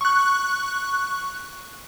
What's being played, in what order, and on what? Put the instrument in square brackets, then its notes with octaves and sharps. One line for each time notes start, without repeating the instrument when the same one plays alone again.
[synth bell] C#6 F#6